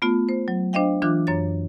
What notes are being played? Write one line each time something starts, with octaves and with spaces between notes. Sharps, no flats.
A3 B3 F4
C5
F#3
D4 C5 D#5 F5 G5
E3 D4 F4 D6 F#6
F#2 C#5 A6